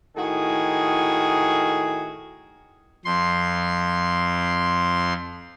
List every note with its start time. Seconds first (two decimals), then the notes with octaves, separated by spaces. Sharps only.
0.16 A2 D#3 F#4 G#4
3.05 F2 C6